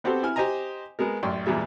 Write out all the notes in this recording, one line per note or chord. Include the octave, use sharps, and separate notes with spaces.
B3 C4 F#4 G4 A4 C5
E4 G#5 F6
G4 C5 D#5 G#5 A#5
G#3 B3 A#4
A1 F#2 D5 G5 C6
E2 A#2 G3 G#3 E5